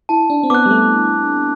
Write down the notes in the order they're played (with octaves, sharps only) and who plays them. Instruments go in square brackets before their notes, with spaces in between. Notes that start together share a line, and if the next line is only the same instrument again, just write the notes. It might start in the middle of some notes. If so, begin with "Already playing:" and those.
[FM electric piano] E4 [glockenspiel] A5
[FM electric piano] D4
C4
[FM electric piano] B3 [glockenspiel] D6 F#6
[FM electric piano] G3
A3